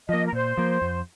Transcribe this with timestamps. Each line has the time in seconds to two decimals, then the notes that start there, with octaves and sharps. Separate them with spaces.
0.09 F3 A#3 D#5
0.26 A#4
0.33 A#2 C5
0.57 F3 A#3
0.82 F2